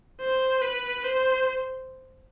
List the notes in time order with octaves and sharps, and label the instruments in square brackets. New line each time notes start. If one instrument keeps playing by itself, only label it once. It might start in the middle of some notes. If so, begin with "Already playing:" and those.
[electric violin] C5
B4
C5